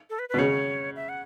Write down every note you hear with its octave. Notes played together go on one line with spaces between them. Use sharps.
A4
B4
B4
B2
C#3 C#5
E5
F#5